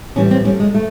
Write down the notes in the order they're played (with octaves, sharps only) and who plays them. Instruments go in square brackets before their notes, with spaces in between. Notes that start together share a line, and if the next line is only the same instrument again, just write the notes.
[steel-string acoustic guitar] A2 E3 G3 C#4
C4
D2 D3 G3 C#4
G#3
A3